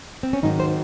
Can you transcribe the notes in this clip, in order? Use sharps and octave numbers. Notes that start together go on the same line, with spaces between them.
C4
C#4
G#2 D#3 F#3 D#4
C5